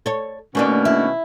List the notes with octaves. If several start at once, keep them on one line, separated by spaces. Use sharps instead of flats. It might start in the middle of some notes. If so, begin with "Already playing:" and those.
A4 C#5
B2 D#3 A3 A#3 C#4 D4
E4